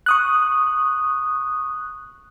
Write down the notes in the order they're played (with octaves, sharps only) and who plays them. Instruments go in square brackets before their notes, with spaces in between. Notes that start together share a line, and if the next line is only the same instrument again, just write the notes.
[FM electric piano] C#6 D#6 F#6